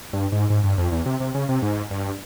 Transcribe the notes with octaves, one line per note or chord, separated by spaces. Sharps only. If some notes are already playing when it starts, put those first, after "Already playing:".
G2
G#2
G#2
G2
F2
E2
C3
C3
C#3
C3
G#2
G2